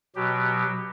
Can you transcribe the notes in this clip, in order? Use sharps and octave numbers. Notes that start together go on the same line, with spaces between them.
B2 F#3 G4